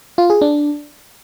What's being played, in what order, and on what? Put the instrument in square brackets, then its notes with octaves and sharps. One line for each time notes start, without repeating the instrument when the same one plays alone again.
[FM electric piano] F4
G#4
D4